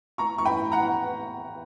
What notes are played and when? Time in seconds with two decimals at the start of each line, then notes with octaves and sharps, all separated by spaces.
0.18 A#5 C#6
0.38 C#6
0.45 G5 B5
0.72 F#5 A#5